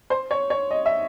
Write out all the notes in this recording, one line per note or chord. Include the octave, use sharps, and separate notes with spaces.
C5
C#5
C#5
D#5
E5